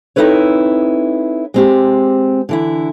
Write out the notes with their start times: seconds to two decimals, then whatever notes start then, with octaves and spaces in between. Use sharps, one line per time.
0.16 C4 D#4 E4 A4 B4 C#5
1.54 G#3 C4 G4
2.49 D3 E3 E4